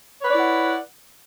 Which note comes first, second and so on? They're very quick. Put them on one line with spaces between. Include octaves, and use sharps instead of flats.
C#5 B4 D5 E4 F#5